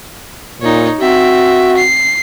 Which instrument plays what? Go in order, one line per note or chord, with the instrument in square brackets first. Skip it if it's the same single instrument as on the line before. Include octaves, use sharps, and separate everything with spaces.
[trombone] A#2 [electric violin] D#4 C#5
[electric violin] C4 E5 [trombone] F#4
[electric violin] C7